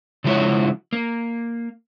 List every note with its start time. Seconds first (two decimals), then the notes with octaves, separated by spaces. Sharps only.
0.24 C#3 F3 G#3 E4 F#4 C#5
0.93 A#3